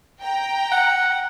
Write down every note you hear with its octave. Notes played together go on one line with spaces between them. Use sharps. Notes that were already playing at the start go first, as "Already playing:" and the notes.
G5 A#5
F#5